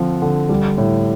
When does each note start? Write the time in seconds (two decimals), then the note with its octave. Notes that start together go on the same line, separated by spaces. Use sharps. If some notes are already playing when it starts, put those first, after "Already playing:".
Already playing: D3 F3 C4
0.22 D3
0.49 G3
0.78 A2